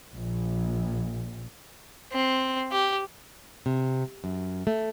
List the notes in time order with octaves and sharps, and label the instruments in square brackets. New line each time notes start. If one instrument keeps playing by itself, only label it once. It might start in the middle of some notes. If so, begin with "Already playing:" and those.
[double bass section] A#1
[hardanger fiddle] C4
G4
[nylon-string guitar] C3
F#2
A3